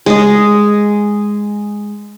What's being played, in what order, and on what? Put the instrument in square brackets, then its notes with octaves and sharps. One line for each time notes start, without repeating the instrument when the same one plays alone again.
[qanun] G#3 D#5